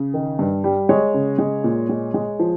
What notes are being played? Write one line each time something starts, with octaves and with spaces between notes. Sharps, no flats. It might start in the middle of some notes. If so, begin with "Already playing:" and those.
Already playing: C#3
D#3
G2
G3
G#3 C#5
C#3
G#3
A#2
G#3
G#3
F3